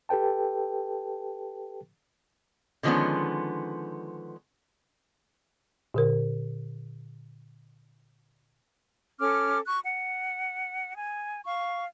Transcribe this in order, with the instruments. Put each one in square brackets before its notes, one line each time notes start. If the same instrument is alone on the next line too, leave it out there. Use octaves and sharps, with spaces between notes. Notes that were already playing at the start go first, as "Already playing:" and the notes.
[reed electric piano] G4 A4 B4 G5 A5
[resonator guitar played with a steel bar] D3 D#3 F3 G#3 B3 C#4
[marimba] A#2 D3 A#4
[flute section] C#4 A4 D6 F6
C#6 F#6
F#5
G#5
F5 C#6